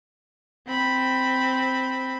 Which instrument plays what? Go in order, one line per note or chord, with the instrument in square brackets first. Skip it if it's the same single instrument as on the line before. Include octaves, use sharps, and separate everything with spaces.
[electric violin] C4 B5